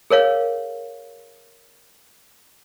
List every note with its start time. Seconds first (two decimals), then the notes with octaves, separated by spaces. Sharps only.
0.11 G#4 A#4 C#5 F5